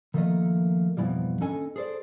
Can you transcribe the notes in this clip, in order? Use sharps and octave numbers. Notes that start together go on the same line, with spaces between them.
D#3 F3 A3 A#3 A#4 D#5
F2 G#2 B2 E3 F3 G3
D#2 C#4 D4 A4 D#5 G#5
G#4 A4 C5 D5